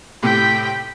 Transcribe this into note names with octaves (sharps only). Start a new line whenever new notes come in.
A2 C3 G5 B6